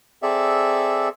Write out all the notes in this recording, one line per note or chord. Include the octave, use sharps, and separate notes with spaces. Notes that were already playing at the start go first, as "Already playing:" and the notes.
C4 G#4 A4 D5 E5